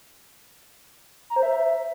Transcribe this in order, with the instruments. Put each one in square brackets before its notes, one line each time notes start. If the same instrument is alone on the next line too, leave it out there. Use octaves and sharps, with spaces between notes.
[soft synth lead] A#5
C5
E5